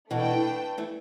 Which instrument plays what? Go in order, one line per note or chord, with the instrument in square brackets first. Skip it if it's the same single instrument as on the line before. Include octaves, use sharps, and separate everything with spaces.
[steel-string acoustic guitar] B2 E3 [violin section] A3 D4 B4 G5
[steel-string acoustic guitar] E3 A3